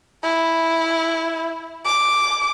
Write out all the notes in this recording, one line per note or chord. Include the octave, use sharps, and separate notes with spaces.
E4
D6